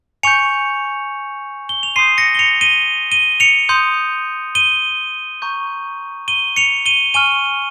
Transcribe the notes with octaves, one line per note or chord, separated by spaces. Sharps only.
G#5 C#6 G6 C#7 F7
G7
F7
C6 D#6 G6 C7 D#7
A#6 C#7
G7
C#7 F7
D#7 G7
D#7 G7
C#7 F7
C6 D#6 G6
D#7 G7
A#5 C#6 G6
D#7 G7
C#7 F7
D#7 G7
G#5 C#6 F6 D#7 G7